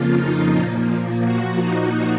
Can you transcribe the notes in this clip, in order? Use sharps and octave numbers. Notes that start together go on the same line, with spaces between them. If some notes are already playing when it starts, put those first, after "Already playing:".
Already playing: F2 C#3 F3 A#3 F4
D#4
A#2 F3 A#3
F#4
D#4